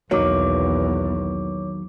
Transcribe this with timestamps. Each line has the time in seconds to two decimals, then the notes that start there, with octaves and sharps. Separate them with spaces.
0.11 B1 E2 D#3 F#3 A#3 C#5 D6